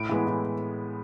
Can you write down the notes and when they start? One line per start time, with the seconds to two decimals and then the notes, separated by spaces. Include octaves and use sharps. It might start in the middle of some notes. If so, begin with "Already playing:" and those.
Already playing: A2 D7
0.09 E3 G#3 B3
0.27 A2